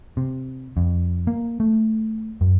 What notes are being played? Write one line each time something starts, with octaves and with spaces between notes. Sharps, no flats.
C3
F2
A#3
A3
F#2